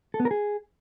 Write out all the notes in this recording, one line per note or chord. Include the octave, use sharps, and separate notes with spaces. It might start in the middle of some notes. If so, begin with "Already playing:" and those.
A4
B3
A#4
G#4